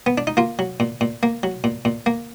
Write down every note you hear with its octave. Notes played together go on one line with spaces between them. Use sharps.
B3
D4
D#4
A#3 F4
F#3
A#2
A#2
A#3
F#3
A#2
A#2
A#3